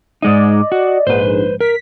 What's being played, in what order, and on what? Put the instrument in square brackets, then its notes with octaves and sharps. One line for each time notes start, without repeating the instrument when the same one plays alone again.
[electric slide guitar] G#2 G#3 D#4 [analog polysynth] D5 D#5
[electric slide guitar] F#4
[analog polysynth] A#1 G#2 [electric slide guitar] B4 C5
[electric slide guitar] A#4 [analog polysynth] B6